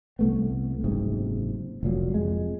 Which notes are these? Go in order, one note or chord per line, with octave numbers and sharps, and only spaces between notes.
C2 A3 B3
F#1 G#2 C3
F1 A#2 F#3
F2 G#3